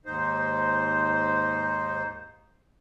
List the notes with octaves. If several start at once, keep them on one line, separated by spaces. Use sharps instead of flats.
D#2 G#2 D#4 C5